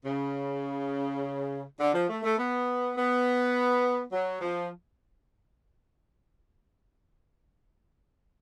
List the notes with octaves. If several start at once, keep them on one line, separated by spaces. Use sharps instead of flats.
C#3
D3
F3
A3
A3
B3
B3
F#3
F3